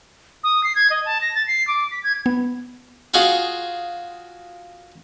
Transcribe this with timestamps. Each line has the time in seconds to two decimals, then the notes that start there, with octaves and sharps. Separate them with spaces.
0.44 D#6
0.64 C7
0.75 G#6
0.90 D#5
1.05 A5
1.21 A#6
1.35 A6
1.47 C7
1.68 D6
1.91 B6
2.04 G#6
2.26 B3
3.14 F4 F#4 G#4 D#5